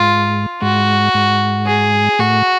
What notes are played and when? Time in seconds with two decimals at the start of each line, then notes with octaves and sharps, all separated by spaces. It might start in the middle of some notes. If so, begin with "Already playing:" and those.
Already playing: G#2 G#3 F4
0.61 G#2 G#3 F#4
1.14 G#2 G#3
1.67 G#4
2.19 A2 A3 F#4